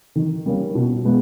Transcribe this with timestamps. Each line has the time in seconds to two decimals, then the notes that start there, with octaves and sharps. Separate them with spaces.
0.16 D#3
0.46 G3 A#3 C#4
0.75 B2
1.05 G#3 B3